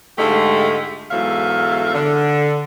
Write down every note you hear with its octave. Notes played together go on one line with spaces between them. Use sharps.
G#2 D3 G#3 A3 F4 G4
E2 G#2 F#3 A4 E5 F5
D3